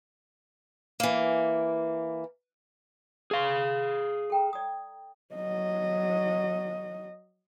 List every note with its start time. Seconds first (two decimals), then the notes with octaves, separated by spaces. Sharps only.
1.00 E3 A#3
3.31 G#4 B4 F5 C6
4.30 A4 G5 A#5
4.53 D5 D#6
5.35 F#3 D#5